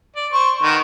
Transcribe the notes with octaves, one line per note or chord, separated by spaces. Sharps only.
D5
C5 C#6
D#3 B3